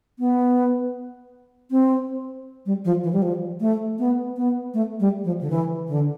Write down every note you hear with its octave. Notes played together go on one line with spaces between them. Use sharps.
B3
C4
G3
F3
E3
G3
F3
A3
B3
B3
A3
G3
F3
D3
E3
D3